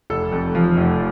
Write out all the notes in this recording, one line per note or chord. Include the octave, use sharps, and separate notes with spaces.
F1 A4
F2
F3
F1